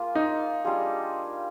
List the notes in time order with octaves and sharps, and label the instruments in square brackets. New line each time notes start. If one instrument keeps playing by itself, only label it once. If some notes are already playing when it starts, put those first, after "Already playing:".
Already playing: [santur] A#3 F4 G#4
[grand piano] D#4
[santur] G3 D4 F4 G#4